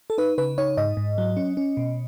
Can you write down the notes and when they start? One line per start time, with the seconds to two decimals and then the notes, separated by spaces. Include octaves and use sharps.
0.10 A4
0.18 D#4 B4
0.38 C#3 B4
0.58 D#4 C#5
0.77 G#2 D#5
0.97 G#2
1.18 F#3
1.37 C#4
1.57 C#4
1.77 B2